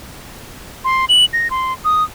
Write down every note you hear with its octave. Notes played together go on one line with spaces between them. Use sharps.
C6
F#7
A#6
C6
D#6